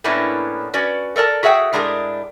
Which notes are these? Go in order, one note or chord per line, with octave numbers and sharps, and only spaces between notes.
A2 A#3 B3 C#4 D4 E4
C#4 F#4 B4 D5
A4 A#4 D5 A5
F#4 G#4 E5 F#5 G5
A2 G#3 D4 G#4 A#4